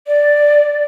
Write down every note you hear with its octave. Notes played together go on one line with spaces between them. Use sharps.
D5